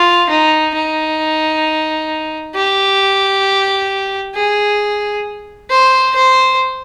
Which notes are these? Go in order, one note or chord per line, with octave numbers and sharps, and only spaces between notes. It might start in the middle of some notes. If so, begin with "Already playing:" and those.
Already playing: F4
D#4
D#4
G4
G#4
C5
C5